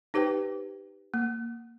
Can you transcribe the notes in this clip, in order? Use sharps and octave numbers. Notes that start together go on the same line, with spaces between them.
D#4 G4 B4 C5 G5
A#3